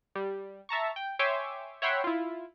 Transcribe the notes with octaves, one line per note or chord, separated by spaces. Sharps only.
G3
E5 A5 A#5 C#6
G5
C#5 E5 G5 G#5 C6 D6
C#5 E5 F#5 G5 B5 C6
E4 F4